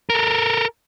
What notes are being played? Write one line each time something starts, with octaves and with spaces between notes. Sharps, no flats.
A4 A#4